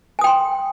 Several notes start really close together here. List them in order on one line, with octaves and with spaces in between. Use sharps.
G#5 D#6 G5 C6